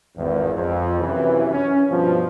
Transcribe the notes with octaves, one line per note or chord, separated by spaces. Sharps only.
G#1 E2
F2
F#2 C3 E3
C#4
G2 B2 F3